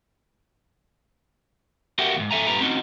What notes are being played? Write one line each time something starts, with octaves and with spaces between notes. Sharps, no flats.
F#4 G4 A#4 E5 F#5 G5
D2 G#2
A4 E5 G#5 A#5
G2 A#2 G4 B4 A#5
C4 C#4 D#4 F#4